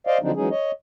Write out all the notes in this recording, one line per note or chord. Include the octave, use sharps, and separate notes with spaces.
C5 D5 D#5 F5
D3 F3 F#3 C4 D4 D#4
E3 F#3 G#3 C#4 D#4 G#4
C#5 D#5